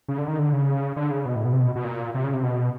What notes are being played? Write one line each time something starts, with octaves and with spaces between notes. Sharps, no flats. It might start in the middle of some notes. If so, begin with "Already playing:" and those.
C#3
D3
D#3
D3
C#3
D3
C#3
B2
A2
B2
C3
B2
B2
A#2
C3
C#3
C3
B2